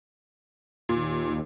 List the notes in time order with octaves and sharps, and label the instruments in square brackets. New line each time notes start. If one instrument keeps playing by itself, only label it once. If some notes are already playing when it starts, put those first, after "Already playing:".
[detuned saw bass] D#2 [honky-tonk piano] A#2